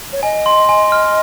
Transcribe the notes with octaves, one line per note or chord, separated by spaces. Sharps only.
C#5
D#5 G#5
C6
G#5
F6